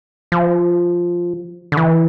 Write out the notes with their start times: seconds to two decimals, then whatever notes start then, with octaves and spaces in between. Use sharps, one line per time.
0.32 F3
1.72 D3
1.77 E3